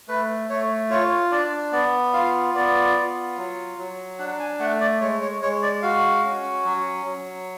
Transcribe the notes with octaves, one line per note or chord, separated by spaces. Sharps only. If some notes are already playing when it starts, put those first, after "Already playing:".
A3 B4
A3 C#5
F4 C#5
D4 D5
B3 D5
F4 F5
B3 D5
F4
F#3
F#3
D4 F#5
G#5
A3 F#5
D5
G#3 C#5
C#5
G#3 C#5
D5
F#4 F5
C#4
F#3
F#3